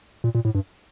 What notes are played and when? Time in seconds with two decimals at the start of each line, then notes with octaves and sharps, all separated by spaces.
0.24 A#2
0.35 A#2
0.45 A2
0.55 G2